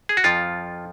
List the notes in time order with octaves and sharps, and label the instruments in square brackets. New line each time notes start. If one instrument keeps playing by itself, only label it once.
[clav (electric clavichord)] G#4
F#4
F2 F3 F4